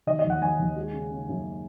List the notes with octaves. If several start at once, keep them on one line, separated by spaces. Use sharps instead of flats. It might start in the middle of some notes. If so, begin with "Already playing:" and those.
D#3 D#5
D#5
D#2
F#5
D#2 G#5
D#2
G#3
C#3
C#3
F#2